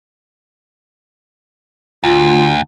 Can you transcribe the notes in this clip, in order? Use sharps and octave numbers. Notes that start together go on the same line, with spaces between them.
D2 F4